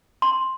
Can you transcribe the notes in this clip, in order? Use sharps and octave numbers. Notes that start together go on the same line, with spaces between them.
C6